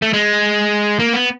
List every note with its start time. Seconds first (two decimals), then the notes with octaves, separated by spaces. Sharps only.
0.02 A3
0.13 G#3
0.99 A#3
1.13 B3